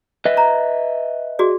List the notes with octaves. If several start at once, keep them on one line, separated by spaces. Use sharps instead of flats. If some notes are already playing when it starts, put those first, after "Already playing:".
B4 D#5 E5
A#5
F#4 G#4 D5